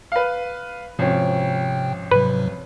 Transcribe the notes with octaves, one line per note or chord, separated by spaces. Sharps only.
B4 F5
G#1 C3 F3 C4 C#4 G5
G#2 C3 F#3 B4